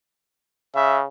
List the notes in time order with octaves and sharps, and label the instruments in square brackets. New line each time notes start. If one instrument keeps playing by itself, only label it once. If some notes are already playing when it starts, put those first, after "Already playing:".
[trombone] C#3 [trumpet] E5